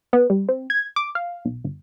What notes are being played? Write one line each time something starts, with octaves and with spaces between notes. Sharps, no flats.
B3
G3
C4
G#6
D6
F5
B1
G1